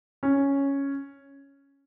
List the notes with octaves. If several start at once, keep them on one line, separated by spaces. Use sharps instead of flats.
C#4